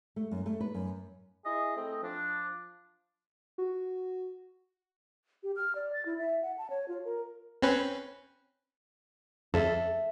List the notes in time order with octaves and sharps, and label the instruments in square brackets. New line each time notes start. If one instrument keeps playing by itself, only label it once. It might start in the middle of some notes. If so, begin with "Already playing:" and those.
[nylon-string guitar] A3
F#2
A3
B4
F#2
[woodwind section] E4 G#4 D#5
A3 C4 D#5
F3 D4
[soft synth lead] F#4
[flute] G4
F6
D5
A6
E4
E5
F#5
A5
C#5
F4
A#4
[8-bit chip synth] C4 C#4 B4
[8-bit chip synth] F2 [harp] A4 E5